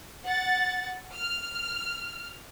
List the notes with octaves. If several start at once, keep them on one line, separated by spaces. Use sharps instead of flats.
F#5 A6
F6